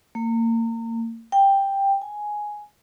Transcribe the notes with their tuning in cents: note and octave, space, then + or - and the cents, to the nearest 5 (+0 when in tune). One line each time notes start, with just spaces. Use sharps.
A#3 -30
G5 +5
G#5 +5